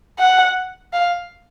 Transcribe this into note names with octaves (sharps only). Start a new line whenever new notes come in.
F#5
F5